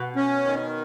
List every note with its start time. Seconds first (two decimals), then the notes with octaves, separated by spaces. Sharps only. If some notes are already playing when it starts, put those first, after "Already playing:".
Already playing: B2
0.16 C#4
0.45 D#3